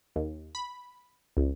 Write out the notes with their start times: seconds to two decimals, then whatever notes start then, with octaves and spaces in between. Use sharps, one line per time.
0.16 D#2
0.55 B5
1.37 C#2